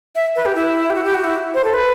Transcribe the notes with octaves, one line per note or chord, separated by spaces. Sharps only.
E5
B4
G4
E4
G4
F#4
G4
F#4
E4
C5
A4
B4